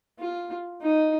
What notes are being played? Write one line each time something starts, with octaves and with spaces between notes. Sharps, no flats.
F4
D#4